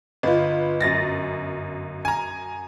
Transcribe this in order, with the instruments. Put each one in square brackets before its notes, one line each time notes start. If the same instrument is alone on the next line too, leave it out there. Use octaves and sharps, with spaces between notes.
[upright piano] G1 [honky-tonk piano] F4 B4 [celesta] D#5
[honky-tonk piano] F#2 A6 A#6
[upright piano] G#5 A#5